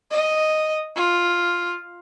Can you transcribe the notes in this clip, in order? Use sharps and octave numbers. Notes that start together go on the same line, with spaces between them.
D#5
F4